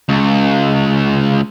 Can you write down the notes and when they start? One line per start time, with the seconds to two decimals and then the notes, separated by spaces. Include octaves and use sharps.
0.09 C#2